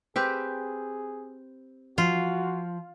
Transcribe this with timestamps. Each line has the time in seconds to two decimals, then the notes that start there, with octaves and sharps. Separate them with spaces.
0.16 C4 G4 G#4 B4
1.98 F3 F4 F#4